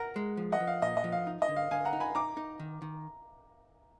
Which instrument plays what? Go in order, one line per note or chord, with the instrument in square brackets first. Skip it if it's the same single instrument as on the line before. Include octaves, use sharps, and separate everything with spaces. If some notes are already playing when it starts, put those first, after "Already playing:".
Already playing: [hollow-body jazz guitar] A#4 [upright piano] F#5 A#5
[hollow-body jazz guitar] G#3
F3
[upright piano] D#5 F#5
[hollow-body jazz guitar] F3
[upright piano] F5
[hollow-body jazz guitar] A#2 [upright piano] D#5
[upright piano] D#5
[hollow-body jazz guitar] F3
[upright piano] F5
[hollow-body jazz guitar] D#4
[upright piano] D#5
[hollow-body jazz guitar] D3
[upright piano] F5
[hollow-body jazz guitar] D3 [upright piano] F5 G#5
[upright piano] F#5 A#5
[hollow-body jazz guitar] D#4
[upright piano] G#5 B5
[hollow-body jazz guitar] D#4 [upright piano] A#5 D6
[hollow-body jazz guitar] D#4
D#3
D#3